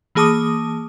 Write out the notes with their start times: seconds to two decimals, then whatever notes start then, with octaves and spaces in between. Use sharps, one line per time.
0.15 E3 A#3 G#4 A5 D6 D#6